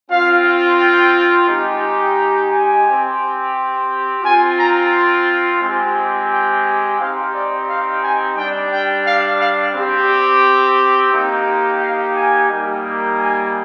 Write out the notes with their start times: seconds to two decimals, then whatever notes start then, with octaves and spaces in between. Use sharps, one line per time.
0.10 C4 F4 F5
0.79 G5
1.48 G#3 D#4 G4
2.17 A#5
2.51 G#5
2.86 C4 G4
4.23 C4 F4 G#5
4.58 A#5
5.61 G#3 C4 G4
6.30 G5
6.99 C4 D#4 G4 F5
7.33 D5
7.68 F5
8.02 G#5
8.37 G3 D4 G4 G5
8.71 G5
9.06 F5
9.40 F5
9.74 C4 G4
11.12 A#3 D#4 G4
11.81 F5
12.15 G#5
12.50 G3 A#3 D#4 G4
13.18 G#5